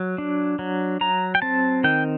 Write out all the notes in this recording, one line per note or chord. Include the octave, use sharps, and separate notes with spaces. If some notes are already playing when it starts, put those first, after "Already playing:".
Already playing: F#3
D4
F#3
F#3 A#5
G5
C4 A5
D#3 G5